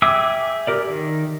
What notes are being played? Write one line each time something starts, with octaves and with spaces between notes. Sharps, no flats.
G#4 E5 G5 D6 E6
G4 A#4 D5
D#3